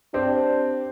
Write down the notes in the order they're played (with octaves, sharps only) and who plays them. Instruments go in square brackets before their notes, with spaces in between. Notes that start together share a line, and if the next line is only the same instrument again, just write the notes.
[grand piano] C4 G4 [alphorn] D4